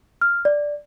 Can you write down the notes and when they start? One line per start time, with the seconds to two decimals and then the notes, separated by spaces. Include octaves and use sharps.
0.21 F6
0.45 D5